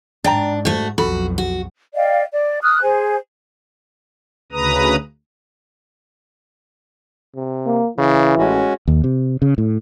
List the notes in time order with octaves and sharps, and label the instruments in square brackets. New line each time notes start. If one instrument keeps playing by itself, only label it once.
[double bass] G#2 [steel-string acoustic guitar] D4 [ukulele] D5 G5 A#5
[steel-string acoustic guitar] A3 F#4 [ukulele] C5
[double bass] B1 F2 [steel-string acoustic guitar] F#4 [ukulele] A4 B5
[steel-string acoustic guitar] F#4
[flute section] D5 D#5 F5 G5
D5
D#6 F6 F#6
G#4 C5 G#5
[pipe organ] D2 C#3 B4 A#5 D#6
[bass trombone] C3
[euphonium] A#3
[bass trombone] C#3 [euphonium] E3
[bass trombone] A1 [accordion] G#3 C#4 F#4
[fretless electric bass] D#2
C3
C#3
A2